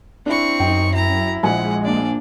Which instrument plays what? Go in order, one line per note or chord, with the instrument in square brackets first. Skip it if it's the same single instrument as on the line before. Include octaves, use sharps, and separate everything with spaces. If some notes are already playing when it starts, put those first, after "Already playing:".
[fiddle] C4 C#6 [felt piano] D4 E4
[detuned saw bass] F#2 [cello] D#4 [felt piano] G5
[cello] E4 [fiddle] A#5
[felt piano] A#1 G#5 [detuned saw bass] G#3 [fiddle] F#5
[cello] A#3 D4 [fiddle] D5